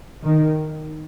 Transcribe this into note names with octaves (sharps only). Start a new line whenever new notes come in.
D#3